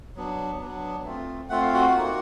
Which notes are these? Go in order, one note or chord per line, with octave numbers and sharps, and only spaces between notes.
F#3 B3 D4
F#3 B3 D4
A3 C4 F4
A3 C4 F4 F#5
F5
F#4 F#5
A#3 D#4 F#4